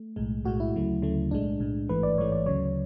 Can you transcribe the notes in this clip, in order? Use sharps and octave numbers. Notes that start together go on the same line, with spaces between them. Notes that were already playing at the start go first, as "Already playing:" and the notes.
Already playing: A3
B1 A2 G#3
B1 A2 G#3 F#4
E4
D2 C#3 F#3 A3
D2 C#3 F#3 A3
B1 A2 G#3 D4
B1 A2 G#3
A1 G#2 E3 A3 B4
D5
A1 G#2 E3 A3 C#5
D5
D2 C#3 F#3 C#5